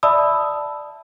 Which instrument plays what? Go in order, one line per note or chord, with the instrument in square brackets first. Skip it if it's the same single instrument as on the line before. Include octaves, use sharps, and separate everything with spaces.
[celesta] D5 E5 A5 B5 D#6 E6